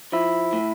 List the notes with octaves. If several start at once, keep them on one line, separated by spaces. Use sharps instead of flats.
F3 E4
A2